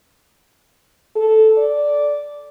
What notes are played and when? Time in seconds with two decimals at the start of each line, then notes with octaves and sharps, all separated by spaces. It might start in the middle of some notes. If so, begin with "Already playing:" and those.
1.16 A4
1.58 D5